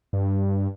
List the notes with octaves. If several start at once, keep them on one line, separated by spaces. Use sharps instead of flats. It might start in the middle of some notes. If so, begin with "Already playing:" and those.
G2